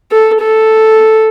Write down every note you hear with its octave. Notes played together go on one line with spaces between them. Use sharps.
A4
A4